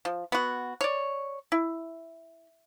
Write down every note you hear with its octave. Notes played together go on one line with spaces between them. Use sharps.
F3
B3 F#4
C#5 D5
E4